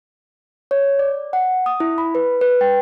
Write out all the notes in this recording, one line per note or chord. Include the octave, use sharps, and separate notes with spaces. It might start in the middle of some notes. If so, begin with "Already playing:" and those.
C#5
D5
F#5
D#6
E4
B5
B4
B4
G5